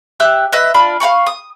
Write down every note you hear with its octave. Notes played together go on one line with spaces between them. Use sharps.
G4 E5 E6 F#6
B4 D#5 E5
D4 F4 B5
F5 F#5 B5 C#6
D#6